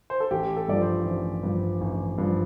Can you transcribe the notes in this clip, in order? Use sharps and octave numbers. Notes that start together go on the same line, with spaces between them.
C5
A4
A1 G4
A4
G2 F3 D5
C5
A1 C5
G2 F3
A1
G2 F3